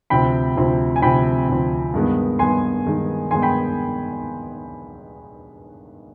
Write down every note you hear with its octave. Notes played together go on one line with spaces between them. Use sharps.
D2 C3 F3 C4 G5 B5
D2 C3 F3 C4
G#5
D2 C3 F3 C4 G5 B5
D2 C3 F3 C4
G2 D#3 G#3 B3
G2 D#3 G#3 B3 G#5 C6
G2 D#3 G#3 B3
G2 D#3 G#3 B3 G#5 C6
G5 B5